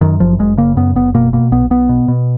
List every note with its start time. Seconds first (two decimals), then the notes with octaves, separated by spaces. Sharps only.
0.01 F#2 D#3
0.20 F#1 F3
0.39 F#1 G#3
0.57 C#3 A#3
0.77 F#2 B3
0.96 F#1 B3
1.14 B2 A#3
1.33 B2 A#3
1.52 B1 B3
1.70 B1 B3
1.89 B2
2.08 B2